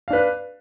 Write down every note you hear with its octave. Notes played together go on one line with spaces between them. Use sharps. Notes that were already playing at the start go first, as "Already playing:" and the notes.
D4 B4 F5